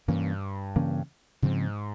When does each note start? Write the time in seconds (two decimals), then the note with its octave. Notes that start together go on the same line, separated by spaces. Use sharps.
0.08 G2 C3 E3 A#3 C#4
0.76 C#3 E3 A#3 C#4
1.42 G#2 C#3 F3 C4